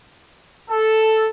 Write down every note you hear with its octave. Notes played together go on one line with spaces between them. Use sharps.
A4